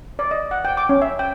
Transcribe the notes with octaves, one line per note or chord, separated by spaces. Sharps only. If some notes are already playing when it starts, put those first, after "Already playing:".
D5
D#5
F#5
G5
D6
C#4
E5
G5